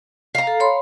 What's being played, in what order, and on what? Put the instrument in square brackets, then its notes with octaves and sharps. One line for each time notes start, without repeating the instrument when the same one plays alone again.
[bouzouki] F5 A#5
[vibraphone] A4
C#5 B5 C6